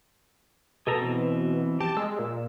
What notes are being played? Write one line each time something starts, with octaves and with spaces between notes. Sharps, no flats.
B2 G#4 A4 A#5
E3 C4
G4 A5
G#3 E6
A#2